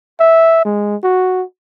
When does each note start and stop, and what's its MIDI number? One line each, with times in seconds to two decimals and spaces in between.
0.20 0.64 76
0.65 0.96 56
1.04 1.44 66